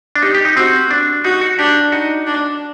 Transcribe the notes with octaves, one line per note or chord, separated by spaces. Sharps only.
D4
D#4 G4
G4
D#4
C4 F#4
D4
D#4 F#4
F#4
D4 G4
D#4 F#4
D4